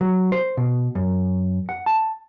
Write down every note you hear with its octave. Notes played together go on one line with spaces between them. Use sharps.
F#3
C5
B2
F#2
F#5
A5